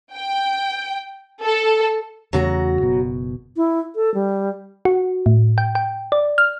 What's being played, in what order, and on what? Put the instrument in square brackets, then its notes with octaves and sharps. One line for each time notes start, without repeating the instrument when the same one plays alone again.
[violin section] G5
A4
[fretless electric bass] E2 C#3 A3 [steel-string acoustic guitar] F#3 F#4 A#5
[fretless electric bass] F#1 B2
[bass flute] E4
A4
G3
[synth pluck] F#4
A2
G5
G5
D5
F6